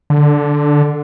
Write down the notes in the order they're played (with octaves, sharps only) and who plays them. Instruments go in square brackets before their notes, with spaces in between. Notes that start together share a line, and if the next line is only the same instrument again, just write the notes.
[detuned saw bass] D3